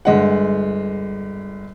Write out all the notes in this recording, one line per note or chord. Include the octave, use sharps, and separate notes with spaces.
G1 G#3 F#5